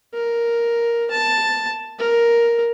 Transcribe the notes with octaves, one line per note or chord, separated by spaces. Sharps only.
A#4
A5
A#4